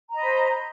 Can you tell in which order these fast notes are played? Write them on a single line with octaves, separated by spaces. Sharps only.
A#5 D#5 B5 C5